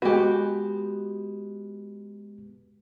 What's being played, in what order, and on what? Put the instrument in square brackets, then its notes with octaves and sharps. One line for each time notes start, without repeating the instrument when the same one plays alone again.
[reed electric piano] G#3 B3 B4 [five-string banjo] F#4 G4